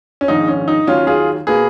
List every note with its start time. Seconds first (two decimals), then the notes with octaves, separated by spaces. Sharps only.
0.21 C#4
0.28 A#1 G#2 D#3 D#4
0.48 C#4
0.68 D#4
0.87 D#2 D#3 F#3 C#4 F4
1.07 F4 G#4
1.47 B2 A#3 G#4 B4